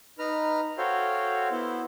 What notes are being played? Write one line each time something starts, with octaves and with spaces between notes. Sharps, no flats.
D#4 B4 A#5 F6
F#4 A4 C5 C#5 F5 G5
B3 E4 C5